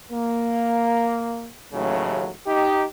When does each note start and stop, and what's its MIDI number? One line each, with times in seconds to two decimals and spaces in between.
0.12 1.48 58
1.73 2.30 33
1.73 2.30 39
1.73 2.30 45
1.73 2.30 49
1.73 2.30 54
2.46 2.83 63
2.46 2.83 67